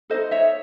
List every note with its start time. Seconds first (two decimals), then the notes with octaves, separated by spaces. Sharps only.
0.10 D#4 F#4 A4 C5 D#5
0.31 C#5 E5